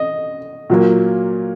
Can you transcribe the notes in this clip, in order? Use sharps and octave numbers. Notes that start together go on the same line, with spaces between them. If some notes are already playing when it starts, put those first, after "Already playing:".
Already playing: D#5
A#2 F#3 A#3